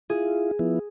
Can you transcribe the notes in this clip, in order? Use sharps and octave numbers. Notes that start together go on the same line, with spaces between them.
E4 F4 G#4
F3 B3 E4